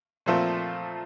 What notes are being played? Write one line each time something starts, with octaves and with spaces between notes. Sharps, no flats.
A#2 F3 A3 C4